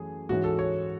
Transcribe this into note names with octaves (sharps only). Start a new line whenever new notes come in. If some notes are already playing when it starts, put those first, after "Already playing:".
Already playing: F#2 E3 A3 G#4
G#2 E3 G#3 C#4 F#4
A4
C#5